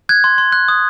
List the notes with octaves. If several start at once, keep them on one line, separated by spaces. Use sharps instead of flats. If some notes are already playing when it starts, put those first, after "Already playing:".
F#6 G#6
C6
C6
F#6
D#6